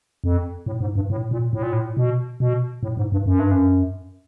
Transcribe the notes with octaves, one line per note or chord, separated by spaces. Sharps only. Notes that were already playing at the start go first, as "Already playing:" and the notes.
F2
A2
G#2
G2
A2
A#2
A2
A#2
A2
B2
B2
A2
G#2
G2
F#2
G2
F#2